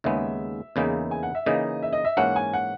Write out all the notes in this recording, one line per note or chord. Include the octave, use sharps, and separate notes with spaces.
D#2 C#3 G#3 B3 E5
E2 C#3 E3 A#3 D#4
G#5
F#5
E5
C#3 E3 A#3 D#4 D#5
E5
D#5
E5
G#2 E3 A#3 C#4 F#5
G#5
F#5